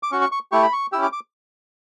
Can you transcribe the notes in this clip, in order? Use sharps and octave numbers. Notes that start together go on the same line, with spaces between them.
D6
C#4 F#4 C#6
C#6
C#6
A3 E4 G4 C#6
B5
C#6
C#4 E4 G4 E6
D6
D6